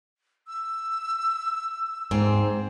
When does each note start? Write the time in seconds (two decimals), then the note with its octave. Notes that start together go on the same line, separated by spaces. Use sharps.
0.48 E6
2.11 G#2 C4